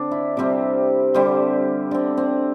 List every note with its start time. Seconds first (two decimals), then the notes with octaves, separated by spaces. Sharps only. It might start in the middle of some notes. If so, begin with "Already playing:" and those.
Already playing: D3 C4 D4
0.11 E4
0.37 C3 G3 C4
1.14 D3 G3 C4
1.91 D3 C4
2.17 C4